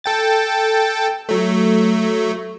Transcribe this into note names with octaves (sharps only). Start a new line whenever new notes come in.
A4 G5 A6
F#3 A3